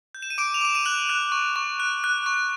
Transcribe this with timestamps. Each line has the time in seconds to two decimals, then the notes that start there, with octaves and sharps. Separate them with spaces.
0.15 G6
0.22 E7
0.30 D#7
0.38 D6 D7 E7
0.54 F7
0.61 D6 E7
0.75 D#7 F7
0.85 F#6 E7 F#7
1.09 F#6
1.32 C#6
1.56 C#6
1.80 F#6
2.04 F#6
2.26 C#6